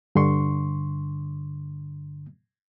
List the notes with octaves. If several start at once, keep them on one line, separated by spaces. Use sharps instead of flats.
G2 D3 C6 C#6